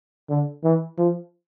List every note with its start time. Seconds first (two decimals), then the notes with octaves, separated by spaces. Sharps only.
0.30 D3
0.64 E3
0.98 F3